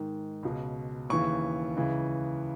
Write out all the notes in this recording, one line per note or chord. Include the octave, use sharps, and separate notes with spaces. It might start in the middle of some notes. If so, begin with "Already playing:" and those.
Already playing: G#2 D#3
C#2 B2
D#2 C#3 E3 C#6
C#2 C#3 E3